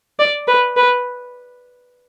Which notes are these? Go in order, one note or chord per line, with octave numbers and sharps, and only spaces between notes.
D5
B4
B4